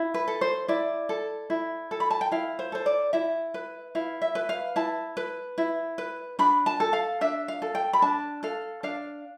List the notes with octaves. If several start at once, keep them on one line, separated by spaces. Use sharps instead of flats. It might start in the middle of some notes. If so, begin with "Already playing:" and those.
Already playing: E4
B4
A4
C5
E4 D5
A4
E4
A4
B5
A5
G5
E4 F5
C5
A4 C5
D5
E4 E5
B4
E4 F5
E5
B4
F5
E4 A5
B4
E4
B4
D4 B5
A5
A4
F5
D4 E5
F5
A4
G5
B5
D4 A5
A4 F5
D4 F5